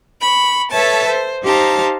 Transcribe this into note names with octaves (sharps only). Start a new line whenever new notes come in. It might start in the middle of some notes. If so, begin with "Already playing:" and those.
B5 C#6
A4 B4 C#5 E5 A5
C5
D#4 G4 C5 F5 A5 A#5